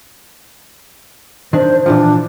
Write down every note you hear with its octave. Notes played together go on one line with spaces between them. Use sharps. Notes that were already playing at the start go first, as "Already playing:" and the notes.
D#3 D4 C5
A#2 E3 F3 D4